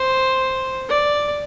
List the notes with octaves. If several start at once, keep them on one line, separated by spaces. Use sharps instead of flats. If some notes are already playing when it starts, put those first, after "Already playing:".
Already playing: C5
D5